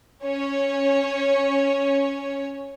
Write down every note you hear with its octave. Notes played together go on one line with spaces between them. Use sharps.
C#4 C#5